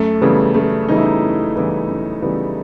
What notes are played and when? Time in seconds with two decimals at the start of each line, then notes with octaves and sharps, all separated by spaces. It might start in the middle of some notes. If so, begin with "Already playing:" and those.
Already playing: F#2 A3
0.22 C#3 E3 G3 B3
0.54 F#2 A3
0.88 C#3 E3 G3 B3 D#4
0.96 E4
1.05 D#4
1.22 F#2
1.56 C#3 E3 G3 B3
1.88 F#2
2.22 C#3 E3 G3 B3